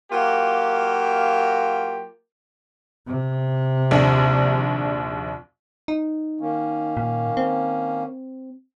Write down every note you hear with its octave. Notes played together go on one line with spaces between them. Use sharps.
F#3 A#3 F4 G4
C3
A#1 D#2 D4
D#4
D#3 A#3 C#4
A#2
C4